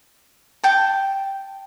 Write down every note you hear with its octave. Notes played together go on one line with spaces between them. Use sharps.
G5 A5